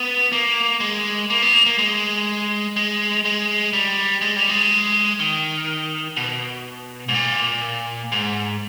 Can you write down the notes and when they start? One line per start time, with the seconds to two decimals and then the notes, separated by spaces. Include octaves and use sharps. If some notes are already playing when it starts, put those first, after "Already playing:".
Already playing: B3
0.32 A#3
0.80 G#3
1.30 A#3
1.42 B3
1.53 A#3
1.66 A#3
1.78 G#3
2.76 G#3
3.25 G#3
3.73 G3
4.21 G#3
4.36 G3
4.49 G#3
5.19 D#3
6.16 B2
7.08 G#2
7.14 A#2
8.12 G#2